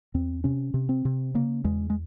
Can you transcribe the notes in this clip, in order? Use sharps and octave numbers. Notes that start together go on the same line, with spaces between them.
E2 C4
C3 C#4
C3
C4
C3
C#3 A#3
E2 G#3
G#3